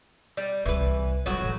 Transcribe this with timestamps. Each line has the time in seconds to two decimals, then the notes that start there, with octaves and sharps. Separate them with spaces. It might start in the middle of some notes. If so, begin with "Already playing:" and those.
0.37 G3
0.66 C2 E3 B4
1.26 A2 C3 F#3 G3 F#4
1.42 A1